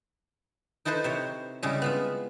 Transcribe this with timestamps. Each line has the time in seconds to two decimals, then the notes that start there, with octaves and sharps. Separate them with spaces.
0.85 D#4 E4 A4 B4 C5
1.04 C3 C5 C#5
1.63 C#3 G3 G#3 E4 G#4
1.82 B3 F4 E5